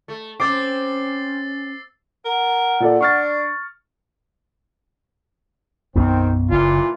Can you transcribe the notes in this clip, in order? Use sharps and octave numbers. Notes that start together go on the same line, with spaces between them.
A3
C4 C#4 D6 E6 A6 C7
A#4 F#5
A#2 A4 D5
D4 C#6 F6 A6
B1 F#2 D#3 B3 C4
F#1 A#2 E3 F4